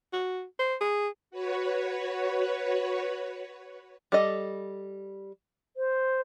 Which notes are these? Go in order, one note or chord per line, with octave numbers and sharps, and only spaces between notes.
F#4
C5
G#4
F#4 B4 C#5
G3 A4 D#5
C5